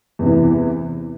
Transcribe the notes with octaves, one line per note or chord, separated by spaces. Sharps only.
E2 C3 E3